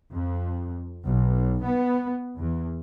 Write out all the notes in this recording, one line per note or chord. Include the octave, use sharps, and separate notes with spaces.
F2
B1
B3
E2